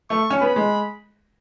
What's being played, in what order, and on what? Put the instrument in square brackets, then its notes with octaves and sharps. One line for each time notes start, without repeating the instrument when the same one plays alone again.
[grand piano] A3 [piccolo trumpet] C#6
[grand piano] C#4
[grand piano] B3 [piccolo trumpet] B5
[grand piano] G#3